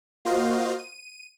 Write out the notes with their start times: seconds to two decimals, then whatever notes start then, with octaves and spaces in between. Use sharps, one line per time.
0.25 A#3 F4 F#4 C5 D#5 F5
0.78 D#7